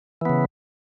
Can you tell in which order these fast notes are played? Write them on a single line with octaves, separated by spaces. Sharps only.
E3 B3 C#3